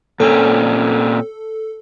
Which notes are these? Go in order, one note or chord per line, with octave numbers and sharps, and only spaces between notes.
A#2 C4 C#4 A4